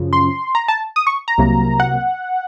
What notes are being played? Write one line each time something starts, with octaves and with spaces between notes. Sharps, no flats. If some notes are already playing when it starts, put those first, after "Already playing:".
Already playing: F#2 C#3 F3
C6
A#5
A5
D#6
C#6
A#5
C2 C3 F#3 A#3
F#5